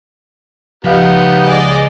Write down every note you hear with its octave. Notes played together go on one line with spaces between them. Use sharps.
C#2 F3 B3 D#4 G4 F5
G#4 D5 D#5